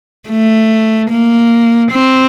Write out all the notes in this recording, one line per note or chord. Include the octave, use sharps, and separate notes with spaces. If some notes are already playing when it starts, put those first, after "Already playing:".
A3
A#3
C4